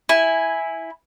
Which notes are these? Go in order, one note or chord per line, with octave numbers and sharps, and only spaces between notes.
E4 G#5